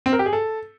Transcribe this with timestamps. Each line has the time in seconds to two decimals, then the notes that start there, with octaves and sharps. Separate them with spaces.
0.06 C4
0.13 A#4
0.19 G4
0.26 G#4
0.33 A4